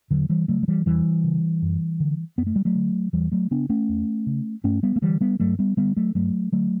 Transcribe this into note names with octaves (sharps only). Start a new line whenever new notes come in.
E2 D3 F#3
E3 G3
C#3 F#3 A3
F#3
E3 G3
E2 E3 G3
C#3
F#2
D3
F#2 B3
A3
G3
F#3 A3
D3
E2 E3 G3
F#3 A3
C#3 B3 D4
A3 C#4
E2
C#3
G2 A3 C#4
G3 B3
A3
D3 E3 G3
G3 B3
G2 F#3 A3
G3 B3
D3 G3 B3
F#3 A3
G2 F#3 A3
D3 F#3 A3